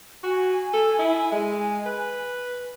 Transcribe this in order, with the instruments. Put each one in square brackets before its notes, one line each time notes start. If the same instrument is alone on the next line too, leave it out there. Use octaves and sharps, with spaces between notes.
[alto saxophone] F#4 [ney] G#5
[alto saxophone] A4
E4
G#3
B4